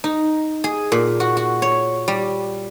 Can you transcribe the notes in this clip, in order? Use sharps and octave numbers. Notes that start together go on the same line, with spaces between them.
D#4
G#4
A#2
F#4
F#4
C#5
G3